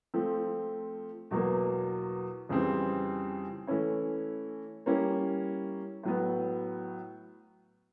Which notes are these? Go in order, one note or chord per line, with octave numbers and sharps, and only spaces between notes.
F3 A3 C4
E2 B2 F#3 A#3
F2 C#3 E3 G3 C4
E3 A3 C#4 E4
G3 A#3 C#4 E4
A2 F#3 B3